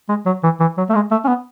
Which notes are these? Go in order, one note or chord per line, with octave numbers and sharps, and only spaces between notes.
G#3
F#3
E3
E3
F#3
A3
G#3
A3
C#4
B3